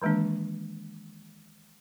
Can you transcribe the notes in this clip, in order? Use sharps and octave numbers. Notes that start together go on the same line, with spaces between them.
D#3 E3 G#3 A#3 D4